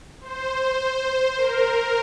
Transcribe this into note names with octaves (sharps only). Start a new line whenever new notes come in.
C5
A#4